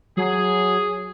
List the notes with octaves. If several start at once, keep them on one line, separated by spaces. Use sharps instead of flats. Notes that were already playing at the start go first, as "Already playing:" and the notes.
F#3 G#4